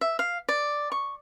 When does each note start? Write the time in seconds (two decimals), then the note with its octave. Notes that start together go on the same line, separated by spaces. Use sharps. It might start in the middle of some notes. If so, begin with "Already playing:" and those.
0.01 E5
0.19 F5
0.49 D5
0.92 C#6